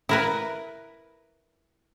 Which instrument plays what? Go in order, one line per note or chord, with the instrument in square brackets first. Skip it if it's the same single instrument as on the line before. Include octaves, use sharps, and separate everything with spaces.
[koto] E4 A#4 B4